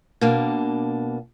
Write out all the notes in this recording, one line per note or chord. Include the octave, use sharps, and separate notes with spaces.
B2 A#3 D4